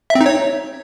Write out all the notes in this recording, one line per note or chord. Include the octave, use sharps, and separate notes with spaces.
E5
C4
D#4
C#5